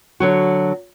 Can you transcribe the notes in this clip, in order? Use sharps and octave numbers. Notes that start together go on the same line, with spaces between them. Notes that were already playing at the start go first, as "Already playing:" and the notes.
D3 F#3 F#4